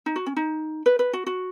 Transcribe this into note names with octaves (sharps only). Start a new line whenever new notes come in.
D#4
F#4
C#4
D#4
B4
B4
F#4
F#4